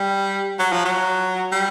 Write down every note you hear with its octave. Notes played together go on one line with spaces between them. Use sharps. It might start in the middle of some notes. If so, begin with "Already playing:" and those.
Already playing: G3
F#3
F3
F#3
G3